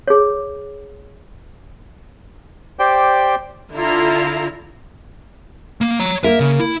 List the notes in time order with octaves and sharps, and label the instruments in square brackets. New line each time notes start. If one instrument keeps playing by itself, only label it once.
[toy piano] G#4 C#5
[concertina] G4 C5 D5 G5
[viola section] D3 E4 F4 A#5
[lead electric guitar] A#3
C#5 A#5
[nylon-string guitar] A#3 A#4 [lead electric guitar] E5
[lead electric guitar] C#3
E4 B5